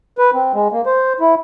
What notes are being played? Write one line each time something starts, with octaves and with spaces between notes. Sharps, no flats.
B4
C4
G#3
A#3
C5
E4